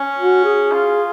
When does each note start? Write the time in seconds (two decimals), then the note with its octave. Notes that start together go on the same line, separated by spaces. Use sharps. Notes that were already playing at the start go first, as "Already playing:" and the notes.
Already playing: C#4
0.19 F#4
0.45 G#4
0.72 F4